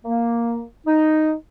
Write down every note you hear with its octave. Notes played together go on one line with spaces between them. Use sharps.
A#3
D#4